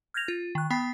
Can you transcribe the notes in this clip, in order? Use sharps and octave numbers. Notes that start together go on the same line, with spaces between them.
F6 G6 G#6 A#6 F7
F4
D#3 F#6
B3 G5 B5 B6 C7